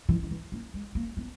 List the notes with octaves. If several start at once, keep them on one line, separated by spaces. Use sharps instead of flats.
E3
D#3
E3
A#3
G#3
A#3
B3